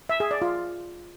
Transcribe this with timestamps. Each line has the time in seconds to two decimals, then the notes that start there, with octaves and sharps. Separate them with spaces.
0.09 E5
0.20 G#4
0.31 D5
0.42 F4